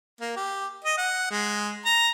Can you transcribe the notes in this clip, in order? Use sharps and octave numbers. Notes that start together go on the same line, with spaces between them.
A#3
G4
D#5
F#5
G#3
A#5